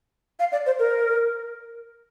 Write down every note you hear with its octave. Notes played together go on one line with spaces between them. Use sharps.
F5
D5
C5
A#4